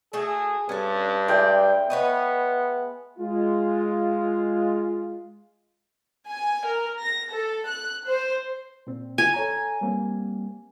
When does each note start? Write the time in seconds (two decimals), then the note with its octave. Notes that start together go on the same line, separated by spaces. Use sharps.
0.13 A3 F#4 G#4 A4
0.69 G2 C#4 A4
1.28 G#3 A3 D5 G5
1.90 B3 B4 C#5 D#5
3.19 G#3 F4
6.28 G#5
6.67 A#4
7.01 A#6
7.32 A4
7.68 F#6
8.07 C5
8.87 A#2 C4
9.18 G#5
9.34 A4 C#5 A#5
9.81 G3 A#3 C4